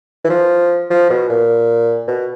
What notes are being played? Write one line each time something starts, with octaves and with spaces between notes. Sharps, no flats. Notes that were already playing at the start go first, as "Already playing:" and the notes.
E3
F3
F3
B2
A#2
B2